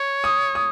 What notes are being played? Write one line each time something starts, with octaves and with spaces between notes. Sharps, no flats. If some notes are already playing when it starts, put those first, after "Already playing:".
Already playing: C#5
D#6
D#6